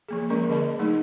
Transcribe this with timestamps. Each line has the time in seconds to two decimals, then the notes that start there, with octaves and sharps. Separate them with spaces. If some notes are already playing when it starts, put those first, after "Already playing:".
0.09 F3 A#3 G#4
0.30 F3 G#3 C#4 A#4 D5
0.49 D3 G#4 D#5 A5 B5
0.79 F#3 A3 D#4 G#4 D#5